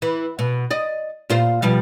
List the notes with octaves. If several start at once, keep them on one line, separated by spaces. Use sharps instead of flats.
E3
B2
D5 D#5
A#2 F4 C5
B2 F3 G3